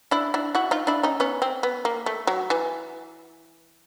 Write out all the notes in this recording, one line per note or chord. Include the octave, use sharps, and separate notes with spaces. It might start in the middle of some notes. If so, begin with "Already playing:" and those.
D4 E4
D4 E4
E4 F#4
D#4 F4
D4 E4
C#4 D#4
B3 C#4
C4
B3
A#3
A3
F#3
E3